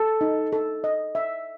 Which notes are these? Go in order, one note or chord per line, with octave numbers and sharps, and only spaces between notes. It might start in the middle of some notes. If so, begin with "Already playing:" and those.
Already playing: A4 A5
D#4
A4
D#5
E5